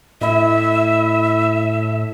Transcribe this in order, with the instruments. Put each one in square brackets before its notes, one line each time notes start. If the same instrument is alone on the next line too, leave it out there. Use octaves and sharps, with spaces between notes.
[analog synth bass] A2 [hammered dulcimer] E4 D#5 [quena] E5